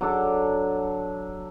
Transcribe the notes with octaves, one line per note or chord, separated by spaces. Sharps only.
F#3 D4 A4 D6